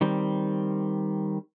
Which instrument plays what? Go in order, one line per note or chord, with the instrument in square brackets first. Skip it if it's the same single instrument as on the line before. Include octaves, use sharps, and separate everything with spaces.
[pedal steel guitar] D#3 G3 C4